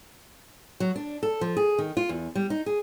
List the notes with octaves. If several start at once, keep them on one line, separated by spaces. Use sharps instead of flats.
F#3
D4
A4
F3
G#4
D#3
F4
E2
G3
D#4
G#4